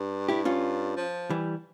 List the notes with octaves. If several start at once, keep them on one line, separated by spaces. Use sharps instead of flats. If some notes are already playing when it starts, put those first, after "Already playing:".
Already playing: G2
G2 E4 G4
C#4 F4
F3
E3 G3